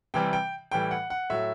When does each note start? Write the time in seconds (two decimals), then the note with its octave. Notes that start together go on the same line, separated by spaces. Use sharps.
0.14 C3 E3 G3 G5
0.33 G5
0.71 A2 E3 G3 G5
0.91 F#5
1.10 F#5
1.30 A2 F#3 E5